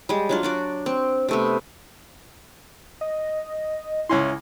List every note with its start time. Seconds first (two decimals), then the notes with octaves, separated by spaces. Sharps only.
0.09 G3 G#3
0.29 F#3 D4 F4
0.43 D4 F#4 D5
0.86 C4
1.29 C3 A3 B3
3.01 D#5
4.09 C#2 C#4 E4 C6